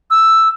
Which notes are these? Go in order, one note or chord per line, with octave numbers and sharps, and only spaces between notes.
E6